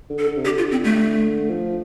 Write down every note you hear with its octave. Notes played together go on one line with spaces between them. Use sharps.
D3
A4
D3
C3
D3 G4
F4
C4
A3
F3